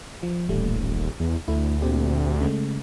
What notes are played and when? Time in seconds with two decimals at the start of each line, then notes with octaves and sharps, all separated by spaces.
0.23 F3
0.49 D#1 A1 G3 A3
1.20 E2
1.48 D2 A3 E4
1.82 A#2 C4 G4
2.41 C#3 G#3 A3